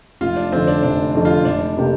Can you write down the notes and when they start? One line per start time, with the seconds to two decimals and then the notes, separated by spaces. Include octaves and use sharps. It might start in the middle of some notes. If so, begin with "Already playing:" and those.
0.21 F1 F4
0.36 D4
0.52 F2 D3 C4
0.67 D4
0.83 F1 D4
1.15 F2 D3
1.25 F4
1.45 F1 D4
1.77 C3 A#3 G4